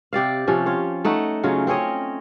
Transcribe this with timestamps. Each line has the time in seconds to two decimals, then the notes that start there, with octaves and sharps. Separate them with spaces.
0.13 C3 G4 D5 F5
0.47 C3 F3 C#4
0.66 F4 C#5
1.05 A3 D#4 F#5
1.44 C#3 F#3 C#4 F4
1.67 C4 C#4 C#5 D#5